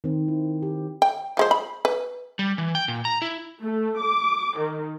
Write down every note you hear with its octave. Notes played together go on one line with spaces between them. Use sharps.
D#3 C4
E4
G4
G5
F3 G#3 C5
B5
B4
G3
E3
G5
A#2
A#5
E4
A3
D6
D#3